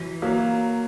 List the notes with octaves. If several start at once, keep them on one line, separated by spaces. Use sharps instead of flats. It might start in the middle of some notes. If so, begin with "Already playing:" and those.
Already playing: E3 F#3
F#3 A#3